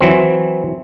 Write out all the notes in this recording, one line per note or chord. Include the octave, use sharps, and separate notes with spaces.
E3 F#3 C4